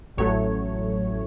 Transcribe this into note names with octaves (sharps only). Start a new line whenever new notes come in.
A1 A2 F#3 A3 C#5